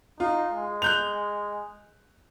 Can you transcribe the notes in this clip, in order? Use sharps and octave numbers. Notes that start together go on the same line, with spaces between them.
D#4 F4
G#3
F#6 G6 F7